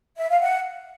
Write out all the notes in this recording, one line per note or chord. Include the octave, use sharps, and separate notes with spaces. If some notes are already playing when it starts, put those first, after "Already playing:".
E5
F5
F#5